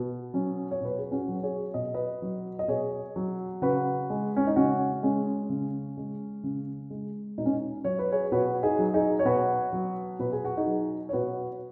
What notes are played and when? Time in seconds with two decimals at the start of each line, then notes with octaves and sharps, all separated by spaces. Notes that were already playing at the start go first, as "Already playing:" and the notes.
Already playing: B2
0.34 F#3 C#4
0.71 C#5
0.81 B2 B4
0.98 G#4
1.11 C#4 F#4
1.28 F#3
1.43 G#4 C#5
1.74 B2 D#5
1.94 B4 D#5
2.22 F#3
2.59 D#5
2.68 B2 G#4 C#5
3.16 F#3
3.62 C#3 F#4 B4
4.10 G#3
4.37 C#4
4.47 D#4
4.56 C#3 C#4 F#4
5.03 G#3 C#4
5.50 C#3
5.97 G#3
6.43 C#3
6.90 G#3
7.38 B2 D#4
7.46 C#4
7.53 D#4
7.84 F#3 C#5
7.99 B4
8.12 G#4 C#5
8.32 B2 F#4 B4
8.63 D#4 G#4
8.79 F#3
8.94 D#4 G#4
9.19 C#5
9.25 B2 F#4 B4
9.73 F#3
10.19 B2 B4
10.32 G#4
10.45 F#4
10.57 D#4 G#4
10.66 F#3
11.09 C#5
11.13 B2 F#4 B4